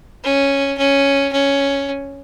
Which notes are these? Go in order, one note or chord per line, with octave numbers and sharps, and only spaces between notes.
C#4
C#4
C#4